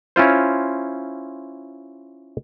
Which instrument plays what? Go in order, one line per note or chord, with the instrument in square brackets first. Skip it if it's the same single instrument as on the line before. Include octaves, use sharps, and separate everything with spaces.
[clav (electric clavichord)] C#4 E4 F4 C5